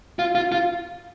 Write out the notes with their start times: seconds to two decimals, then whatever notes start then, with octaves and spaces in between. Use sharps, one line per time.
0.19 F4
0.35 F4
0.52 F4